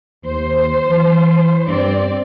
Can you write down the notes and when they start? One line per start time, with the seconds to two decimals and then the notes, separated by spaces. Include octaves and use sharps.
0.23 D#2 C5
0.88 E3
1.67 G2 C4 D5